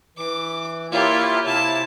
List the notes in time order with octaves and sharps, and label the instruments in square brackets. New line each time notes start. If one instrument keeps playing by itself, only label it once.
[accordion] E3 [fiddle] D6
[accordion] A#3 E4 F4 [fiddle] G4 C#5
[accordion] C3 E4 [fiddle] A5